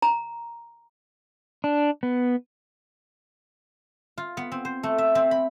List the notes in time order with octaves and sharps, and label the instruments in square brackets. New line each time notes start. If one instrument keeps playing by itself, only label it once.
[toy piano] A#5
[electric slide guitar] D4
B3
[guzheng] F4
B3
C4
C5
A3
E5
C4
B5